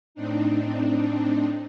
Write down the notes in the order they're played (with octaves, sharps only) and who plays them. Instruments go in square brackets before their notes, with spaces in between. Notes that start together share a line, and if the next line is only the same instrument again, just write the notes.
[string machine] A2 C4 D4 D#4